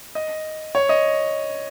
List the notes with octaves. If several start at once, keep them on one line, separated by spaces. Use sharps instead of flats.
D#5
C#5
D#5